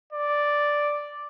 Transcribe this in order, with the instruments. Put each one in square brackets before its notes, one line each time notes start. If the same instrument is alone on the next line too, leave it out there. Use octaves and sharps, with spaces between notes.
[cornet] D5